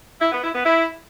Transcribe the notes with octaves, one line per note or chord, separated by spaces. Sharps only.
E4
B3
E4
B3
E4